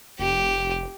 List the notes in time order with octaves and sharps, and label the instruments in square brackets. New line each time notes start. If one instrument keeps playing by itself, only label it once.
[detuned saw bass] F1 [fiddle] G4